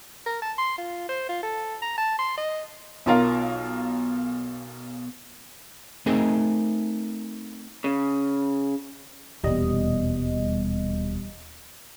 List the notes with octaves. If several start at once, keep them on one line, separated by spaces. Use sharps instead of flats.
A#4
A5
C6
F4
C5
F4
A4
A#5
A5
C6
D#5
B1 B2 F4 A#4 F5
A3 C4 D#4 G#4 A#4 D#5
C#3
D#1 E2 B2 G3 D#5